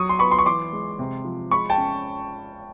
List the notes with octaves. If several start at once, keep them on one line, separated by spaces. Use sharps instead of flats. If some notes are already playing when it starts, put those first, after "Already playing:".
Already playing: F#3 C#6 D#6
C6
B3 B5 C#6
C6
C#6
E3 C6 D6
G#3
C3
F3
G#3 B5 C#6
G5 A5
C#4